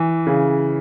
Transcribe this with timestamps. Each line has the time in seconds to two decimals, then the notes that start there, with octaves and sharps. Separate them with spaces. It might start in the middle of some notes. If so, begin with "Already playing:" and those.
Already playing: E3
0.27 C#3